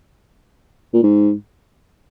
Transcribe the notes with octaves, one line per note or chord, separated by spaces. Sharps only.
A#2
G#2